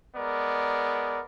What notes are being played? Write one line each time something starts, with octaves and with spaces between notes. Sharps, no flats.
G#3 B3 A#4 D5